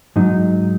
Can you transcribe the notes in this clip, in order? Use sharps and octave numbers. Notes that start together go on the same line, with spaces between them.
G#2 F#3 D#4